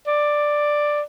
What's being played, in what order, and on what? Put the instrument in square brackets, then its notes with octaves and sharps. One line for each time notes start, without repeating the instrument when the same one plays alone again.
[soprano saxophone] D5